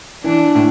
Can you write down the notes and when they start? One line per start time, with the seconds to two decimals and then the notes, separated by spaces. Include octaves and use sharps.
0.24 E3 D4
0.55 A2